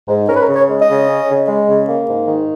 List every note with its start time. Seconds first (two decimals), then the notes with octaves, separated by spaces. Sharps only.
0.08 G#2
0.28 C#4 A#4
0.36 B4
0.42 A#4
0.48 C#3
0.55 C#5
0.68 G#3
0.81 D#5
0.88 C#3
1.08 C#4
1.28 C#3
1.47 G#3
1.68 C#3
1.88 A#3
2.08 G#2
2.28 D#3